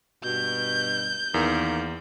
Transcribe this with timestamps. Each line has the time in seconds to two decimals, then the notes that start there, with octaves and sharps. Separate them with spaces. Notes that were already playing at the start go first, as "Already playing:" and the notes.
0.24 G2 B2 G6
1.34 E2 D#3 A#3